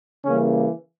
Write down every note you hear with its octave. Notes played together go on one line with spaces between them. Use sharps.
C#3 E3 G3 A#3 C#4